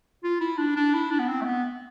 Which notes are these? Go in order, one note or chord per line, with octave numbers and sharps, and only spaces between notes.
F4
E4
D4
D4
E4
D4
B3
C4
A3
B3